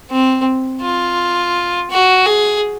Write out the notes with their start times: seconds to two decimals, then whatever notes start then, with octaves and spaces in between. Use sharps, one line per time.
0.11 C4
0.82 F4
1.90 F#4
2.26 G#4